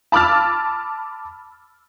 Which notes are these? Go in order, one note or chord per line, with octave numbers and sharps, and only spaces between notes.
A5 B5 D6 E6 F6 A6